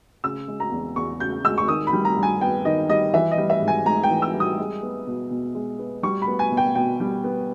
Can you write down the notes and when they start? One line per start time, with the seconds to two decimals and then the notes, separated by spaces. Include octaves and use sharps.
0.24 C#3 E6
0.48 G#3
0.60 A#5
0.72 E2
0.96 E2 C#6
1.20 C#3 G6
1.44 G#3 E6
1.58 C#6
1.68 D#3 D#6
1.87 B5
1.93 G3
2.05 A#5
2.17 G2
2.23 G#5
2.41 B3 G5
2.65 D#3 D#5
2.89 G3 D#5
3.14 E3 E5
3.31 D#5
3.38 G3
3.50 E5
3.62 G#2
3.68 G#5
3.86 G#2 A#5
4.03 G5
4.10 E3
4.22 E6
4.34 G3
4.40 D#6
4.59 G#3
4.82 B3
5.07 B2
5.31 B2
5.55 G#3
5.79 B3
6.03 G3 C#6
6.22 B5
6.27 B3
6.39 G#5
6.51 B2
6.57 G5
6.75 B2 G5
7.00 G3
7.24 B3